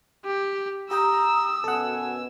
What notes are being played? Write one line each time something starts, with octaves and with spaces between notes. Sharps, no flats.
G4
G4 G5 A#5 D#6 E6
F#2 B2 A4 F#5 G#5